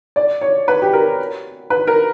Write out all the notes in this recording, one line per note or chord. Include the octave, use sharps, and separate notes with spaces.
D5
C#5
B4
G4
A#4
B4
A#4